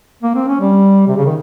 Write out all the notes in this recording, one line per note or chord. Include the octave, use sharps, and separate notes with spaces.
A#3
C4
C#4
G3
C3
C#3
D#3